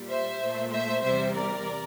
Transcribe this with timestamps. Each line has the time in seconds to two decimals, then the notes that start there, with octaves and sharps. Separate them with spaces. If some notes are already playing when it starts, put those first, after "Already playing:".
Already playing: A#2 G3
0.09 C5 E5
0.40 A#2 A3
0.72 C5 E5
1.02 E2 C3 G3 C5 E5
1.34 A#4 D5